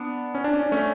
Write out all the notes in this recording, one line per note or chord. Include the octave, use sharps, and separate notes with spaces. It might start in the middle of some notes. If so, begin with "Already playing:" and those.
Already playing: B3 D4
C#4
D4
C#4
D4
A3 C#4